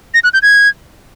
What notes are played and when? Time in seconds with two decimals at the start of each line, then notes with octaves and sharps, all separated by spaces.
0.14 A#6
0.24 F#6
0.33 G6
0.42 G#6